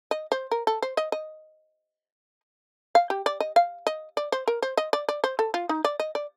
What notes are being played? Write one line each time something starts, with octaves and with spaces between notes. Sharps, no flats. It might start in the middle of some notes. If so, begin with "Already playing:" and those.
D#5
C5
A#4
A4
C5
D#5
D#5
F5
G4
D5
D#5
F5
D#5
D5
C5
A#4
C5
D#5
D5
D5
C5
A4
F4
D#4
D5
D#5
D5